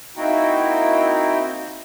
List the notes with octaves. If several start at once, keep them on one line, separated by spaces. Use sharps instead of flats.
A#3 C4 D#4 E4 F#4 G5